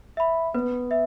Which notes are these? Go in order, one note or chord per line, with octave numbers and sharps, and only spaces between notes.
E5 B5
B3 B4
E5